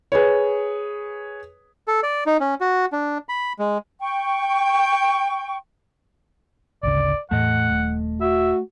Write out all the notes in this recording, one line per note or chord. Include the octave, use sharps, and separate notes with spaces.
G#4 B4 C#5
A4
D5
D#4
C#4
F#4
D4
B5
G#3
G5 C#6
G#1 D2 C#3 D5
E2 A2 A3 D#5 F#5
D#1
F#4 E5